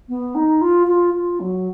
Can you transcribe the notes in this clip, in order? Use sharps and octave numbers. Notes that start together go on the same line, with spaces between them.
B3
D#4
F4
F4
F4
F#3